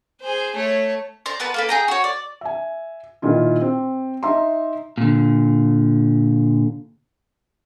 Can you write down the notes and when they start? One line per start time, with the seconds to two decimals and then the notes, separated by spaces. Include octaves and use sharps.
0.22 G#4 C5
0.55 A3 C#5
1.26 C5 D5 A#5
1.40 B3 A#4 B4 A5
1.54 A#3 A4 B4
1.69 G#4 G5 A#5
1.88 F#4 C#5
2.04 D5
2.41 E5 G#5
3.22 A#2 D#3 E4 F4
3.61 C4
4.23 D#4 E5 A#5 C6
4.98 A#2 D3